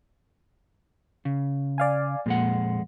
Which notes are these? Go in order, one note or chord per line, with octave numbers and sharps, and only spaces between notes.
C#3
D5 F5 G#5
F2 A#2 G#3 F#5